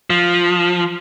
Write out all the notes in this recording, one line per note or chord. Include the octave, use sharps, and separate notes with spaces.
F3